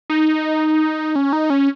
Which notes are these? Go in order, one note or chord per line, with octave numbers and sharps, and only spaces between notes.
D#4
C#4
D#4
C#4